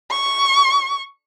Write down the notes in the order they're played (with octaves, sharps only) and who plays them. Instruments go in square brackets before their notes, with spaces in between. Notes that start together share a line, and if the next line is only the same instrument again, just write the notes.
[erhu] C#6